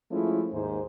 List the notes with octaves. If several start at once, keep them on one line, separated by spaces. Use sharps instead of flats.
F3 G#3 A3 C#4 E4
D#2 G#2 C5